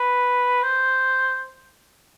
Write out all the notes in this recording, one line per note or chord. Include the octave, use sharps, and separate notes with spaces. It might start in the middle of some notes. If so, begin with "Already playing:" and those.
Already playing: B4
C5